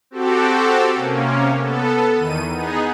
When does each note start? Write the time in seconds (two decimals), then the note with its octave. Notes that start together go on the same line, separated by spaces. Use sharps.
0.11 C4 F#4 G4 A4
0.95 C3 A#3 C#4
1.59 B3 A4
2.16 E2 D#3 D#7
2.52 B3 D#4 G#4